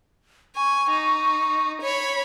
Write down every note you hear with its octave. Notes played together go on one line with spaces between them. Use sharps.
G#5 C#6
D#4
C#5 B5